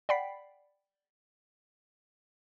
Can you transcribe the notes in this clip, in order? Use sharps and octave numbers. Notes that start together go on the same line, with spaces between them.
D5 F#5 G5 B5 B6 C7